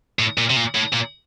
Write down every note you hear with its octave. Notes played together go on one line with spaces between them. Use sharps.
A2
A#2
C3
A#2
A2
A#2